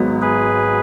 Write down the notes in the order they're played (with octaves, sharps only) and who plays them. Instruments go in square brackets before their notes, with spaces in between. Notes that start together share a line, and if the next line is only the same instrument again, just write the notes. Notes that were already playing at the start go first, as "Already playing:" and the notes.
Already playing: [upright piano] G#1 G#2 F#3 B3
[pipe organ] G#4 B4